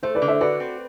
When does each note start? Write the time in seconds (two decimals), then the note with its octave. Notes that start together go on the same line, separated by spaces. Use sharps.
0.03 A3 C5
0.15 B4 D5
0.22 D3
0.28 C5 E5
0.41 F#4 B4 D5
0.60 C4